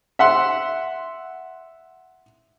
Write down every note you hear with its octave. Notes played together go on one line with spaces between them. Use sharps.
E5 F#5 C6